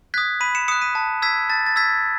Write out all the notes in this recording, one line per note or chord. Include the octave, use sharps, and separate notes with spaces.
D#6 F#6 G#6 B6
B5 B6 D#7
C#7 E7
D#6 F#6 C#7 E7
B6 D#7
A5
E6 G#6 B6
A5 A6
A6
E6 G#6 B6